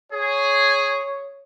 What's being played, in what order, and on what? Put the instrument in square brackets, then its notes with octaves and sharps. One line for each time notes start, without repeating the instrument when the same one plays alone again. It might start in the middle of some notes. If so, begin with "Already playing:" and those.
[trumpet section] G#4 [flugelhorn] C#5